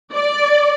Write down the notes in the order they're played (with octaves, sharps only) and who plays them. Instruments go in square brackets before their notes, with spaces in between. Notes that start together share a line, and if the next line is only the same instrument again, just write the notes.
[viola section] D5